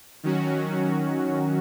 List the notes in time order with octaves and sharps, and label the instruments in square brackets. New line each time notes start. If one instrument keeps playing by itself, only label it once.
[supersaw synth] D#3 F#3 C#4 F#4